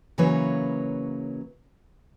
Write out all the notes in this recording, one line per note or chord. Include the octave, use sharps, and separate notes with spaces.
C#3 E3 F#3 A#3 B4 C#5